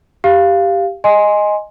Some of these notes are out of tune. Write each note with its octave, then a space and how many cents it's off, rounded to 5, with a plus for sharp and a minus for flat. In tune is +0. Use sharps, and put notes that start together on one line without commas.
G4 +0 F5 -10
D#5 +0 G#5 +0 C6 +5